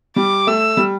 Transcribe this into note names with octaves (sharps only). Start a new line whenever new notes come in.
G3 D6
A3 E6
G3